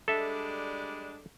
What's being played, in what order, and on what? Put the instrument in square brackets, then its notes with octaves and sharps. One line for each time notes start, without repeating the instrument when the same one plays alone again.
[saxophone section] G3 G#3 D4 [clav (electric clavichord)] A4 E5